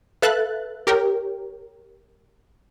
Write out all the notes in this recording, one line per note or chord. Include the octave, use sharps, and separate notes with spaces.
A4 B4 E5 F5 F#6 A6
G4 A#4 C#5 G5